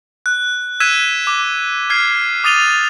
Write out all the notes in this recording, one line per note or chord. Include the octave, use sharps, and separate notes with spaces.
F#6
E6 F#6 G#6 B6 D#7 E7
D6
F6 G#6 C7
D6 D#6 A6 D#7 F7 G7